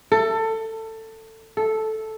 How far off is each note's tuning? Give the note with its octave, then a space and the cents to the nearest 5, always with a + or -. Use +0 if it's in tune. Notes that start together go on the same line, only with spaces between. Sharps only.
A4 +20
A4 -5